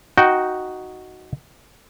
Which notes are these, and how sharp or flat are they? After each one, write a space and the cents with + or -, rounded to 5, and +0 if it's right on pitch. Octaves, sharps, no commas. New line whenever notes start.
D#4 +0 F#4 +0 G5 -15